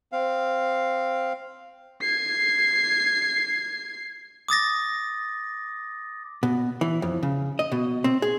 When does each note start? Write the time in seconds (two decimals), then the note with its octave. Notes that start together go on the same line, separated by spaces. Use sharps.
0.12 C4 F5
2.01 G#6 C7
4.48 D6 D#6 A6 A#6
6.43 B2
6.81 E3
7.02 F2
7.23 C#3
7.59 D#5
7.72 B2
8.04 C4
8.22 G#4